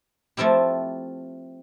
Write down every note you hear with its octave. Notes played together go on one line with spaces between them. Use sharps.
F3 A3 C4 E4 G4